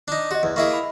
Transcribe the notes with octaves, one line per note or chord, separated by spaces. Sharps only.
D4 D#4
F#4 G4 D#5
E2 E4 D5
A#3 E4 G#4 D#5 E5 C#6
A5 B5